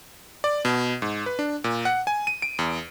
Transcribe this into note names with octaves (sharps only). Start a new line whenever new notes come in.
D5
B2
G#2
B4
D4
A#2
F#5
G#5
D#7
D7
E2